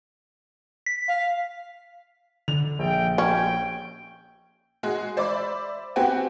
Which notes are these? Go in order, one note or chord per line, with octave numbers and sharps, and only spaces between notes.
B6
F5
D3 F7
A#1 G5
C#4 G5 G#6
G#3 F#4 G#4
C5 D5 E5 B5 D6
C4 F#4 G4 B4 F#5 G#5